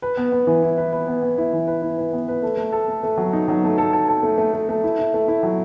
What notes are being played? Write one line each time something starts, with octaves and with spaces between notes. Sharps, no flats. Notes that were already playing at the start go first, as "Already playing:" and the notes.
B4
B3
B3
E3
E4
B4
B4
B3
B3
E4
E3
B4
E4
B4
B3
B4
A3
A3
A4
A3
A3
F#3
D#4
F#3
A3
A4
A4
A4
A3
A3
A3
A3
E4
E4
A3
E4
F#3